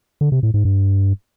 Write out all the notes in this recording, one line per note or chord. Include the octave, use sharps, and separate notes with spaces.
D3
C3
A2
G#2
G2